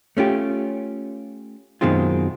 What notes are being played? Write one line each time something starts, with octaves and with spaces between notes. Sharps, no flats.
A3 C#4 F4 G4
F#2 B2 D#3 G#3 C4 F4